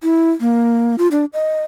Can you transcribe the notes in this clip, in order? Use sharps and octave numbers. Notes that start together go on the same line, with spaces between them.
E4
A#3
F4
D4
D#5